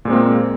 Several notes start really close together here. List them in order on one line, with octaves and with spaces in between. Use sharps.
A#2 G#3 C4 A#3